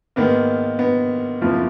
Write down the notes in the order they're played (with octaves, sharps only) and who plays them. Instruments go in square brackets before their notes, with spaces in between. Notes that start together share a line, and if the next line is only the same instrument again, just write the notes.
[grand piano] G#2 D#3 A#3 [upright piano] B3
[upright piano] B3
[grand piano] F#1 F2 F3 A#3 F4